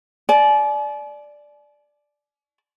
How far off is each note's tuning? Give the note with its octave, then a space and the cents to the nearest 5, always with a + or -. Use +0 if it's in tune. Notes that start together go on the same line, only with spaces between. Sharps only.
D5 +0 G#5 +45